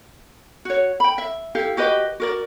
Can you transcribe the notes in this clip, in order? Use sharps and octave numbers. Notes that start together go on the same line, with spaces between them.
F#4 C#5
G5 B5
E5
E4 G4 A4 F5
F#4 G4 B4 D#5
F#4 A#4 D5